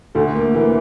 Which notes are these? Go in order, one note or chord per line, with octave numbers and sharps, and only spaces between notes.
D2 A3
A#3
E3 A#3